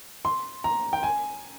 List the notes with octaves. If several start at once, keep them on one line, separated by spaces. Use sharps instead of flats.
C6
A#5
G5
G#5